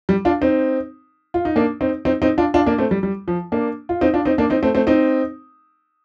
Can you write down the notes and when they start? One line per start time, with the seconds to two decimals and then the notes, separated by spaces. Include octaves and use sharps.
0.09 G3
0.25 D4 F4
0.41 C4 D#4
1.34 F4
1.45 D#4
1.56 A#3 D4
1.81 C4 D#4
2.05 C4 D#4
2.22 C4 D#4
2.38 D4 F4
2.54 D4 F4
2.66 A#3 D4
2.78 A3 C4
2.91 G3
3.03 G3
3.28 F3
3.52 A#3 D4
3.89 F4
4.01 C4 D#4
4.14 D4 F4
4.25 C4 D#4
4.38 A#3 D4
4.50 C4 D#4
4.63 A3 C4
4.75 A3 C4
4.87 C4 D#4